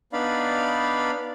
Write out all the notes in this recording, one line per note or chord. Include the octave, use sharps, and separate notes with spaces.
B3 D4 D#4 D5 F5 B5